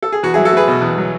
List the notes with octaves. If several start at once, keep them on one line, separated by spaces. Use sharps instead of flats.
A4
G#4
E2 F#4
F#3 E4 G#4
F#4 A4
A3 G#4 B4
B2
E2
F#3